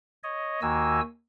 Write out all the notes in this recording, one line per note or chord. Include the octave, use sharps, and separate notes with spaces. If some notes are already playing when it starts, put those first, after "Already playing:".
C#5 D#5
D#2 D#3 A#3 F#4 G#5 E6